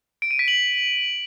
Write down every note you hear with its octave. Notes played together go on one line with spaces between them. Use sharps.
D7
D#7
B6
F#7